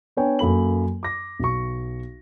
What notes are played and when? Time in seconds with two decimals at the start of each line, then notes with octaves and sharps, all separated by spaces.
0.17 B3 D4 B4 C#5 G5 G#5
0.39 F#2 A#3 A4 B5 F#7
1.03 D6 A#6
1.39 B1 C#6